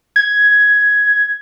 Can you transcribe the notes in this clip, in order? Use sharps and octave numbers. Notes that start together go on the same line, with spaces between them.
G#6